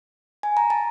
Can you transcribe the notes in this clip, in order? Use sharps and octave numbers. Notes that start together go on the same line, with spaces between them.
G#5
A#5
A5